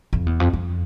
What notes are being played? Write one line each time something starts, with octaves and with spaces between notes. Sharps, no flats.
F2
E2
F2
F2